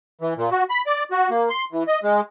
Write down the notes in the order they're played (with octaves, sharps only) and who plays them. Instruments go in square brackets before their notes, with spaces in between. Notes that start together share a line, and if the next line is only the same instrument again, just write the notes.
[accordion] E3
A#2
F#4
B5
D5
F#4
A#3
C6
E3
D#5
G#3